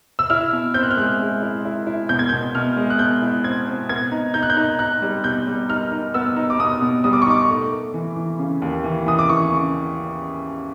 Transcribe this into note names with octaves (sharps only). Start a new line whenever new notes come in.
E6
E4 F6
B2
C4 G6
F#6
F6
G#3 F#6
G#3
E4
E4
E4
B2 G6
G#6
B2 G6
B2 F6
G#3
F#6
B2 G6
E4
C4 G#6
C4
B3 G#6
D#4
D#4 G6
F#6
G6
D#4
D#4 F#6
G3
B2 G6
G3
D#4 F6
D#4
B3 E6
D#4
D6
B2 D#6
B2
G3 D#6
D6
C#6
D#4 D6
A3
A3
E3
E3
C#3
D#2
E3
E3 D#6
D6
E3 C#6
C#3